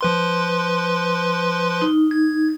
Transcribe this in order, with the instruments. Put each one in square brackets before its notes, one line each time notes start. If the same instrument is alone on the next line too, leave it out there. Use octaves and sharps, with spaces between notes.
[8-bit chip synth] F3 B4 C6
[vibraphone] D#4
[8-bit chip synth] G#6